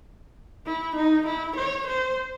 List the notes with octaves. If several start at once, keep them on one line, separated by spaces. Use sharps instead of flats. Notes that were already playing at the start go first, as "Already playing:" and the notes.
E4
D#4
E4
C#5
C5